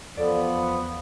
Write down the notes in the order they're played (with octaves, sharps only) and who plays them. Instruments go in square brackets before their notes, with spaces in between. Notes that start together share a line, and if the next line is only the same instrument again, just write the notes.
[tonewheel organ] E2 [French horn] F3 [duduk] B3 [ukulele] A4 D5